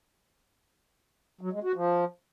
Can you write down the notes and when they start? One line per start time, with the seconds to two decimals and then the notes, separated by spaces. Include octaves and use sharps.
1.41 F#3
1.53 G#3
1.64 F#4
1.75 F3